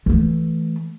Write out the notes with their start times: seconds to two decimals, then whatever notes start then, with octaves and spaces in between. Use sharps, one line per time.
0.06 E3 A3